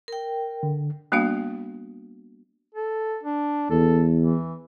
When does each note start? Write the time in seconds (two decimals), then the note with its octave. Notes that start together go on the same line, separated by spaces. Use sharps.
0.08 A#4 G5
0.63 D3
1.12 G3 A#3 B3 D4 F#4 F5
2.74 A4
3.23 D4
3.70 E2 A4
4.22 E3